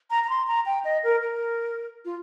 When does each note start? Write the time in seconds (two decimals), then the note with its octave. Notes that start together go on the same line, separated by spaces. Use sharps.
0.10 A#5
0.24 A#5
0.30 C6
0.48 A#5
0.66 G5
0.85 D#5
1.04 A#4
1.22 A#4
2.05 F4